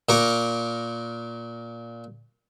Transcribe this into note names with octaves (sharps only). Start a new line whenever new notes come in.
A#2 A#4 C#6 D6